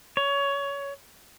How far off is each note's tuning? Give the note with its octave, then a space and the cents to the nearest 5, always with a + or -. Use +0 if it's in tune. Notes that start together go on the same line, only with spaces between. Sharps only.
C#5 +20